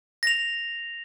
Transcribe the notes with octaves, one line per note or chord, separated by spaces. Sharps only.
A#6 F7